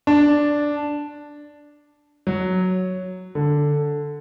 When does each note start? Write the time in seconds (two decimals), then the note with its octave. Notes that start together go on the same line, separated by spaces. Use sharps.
0.07 D4
2.27 F#3
3.35 D3